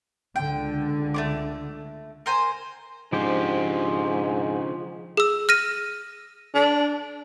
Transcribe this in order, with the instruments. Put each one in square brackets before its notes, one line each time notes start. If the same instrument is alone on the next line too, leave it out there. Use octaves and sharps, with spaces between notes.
[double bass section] C#2 D3 [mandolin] G5
[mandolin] A3 C#4 D6
A#4 C5 G#5
[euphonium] G#2 [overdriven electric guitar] C#3 D4 [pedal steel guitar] F3 G4 C5
[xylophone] G#4 E6
F6 A#6 D#7
[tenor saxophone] D4